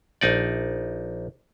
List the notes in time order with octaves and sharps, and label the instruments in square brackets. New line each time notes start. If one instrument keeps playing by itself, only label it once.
[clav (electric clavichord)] A#1 D#4 D5